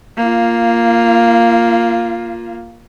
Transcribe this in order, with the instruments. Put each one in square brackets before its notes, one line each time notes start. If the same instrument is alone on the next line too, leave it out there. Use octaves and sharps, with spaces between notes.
[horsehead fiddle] A#3 F4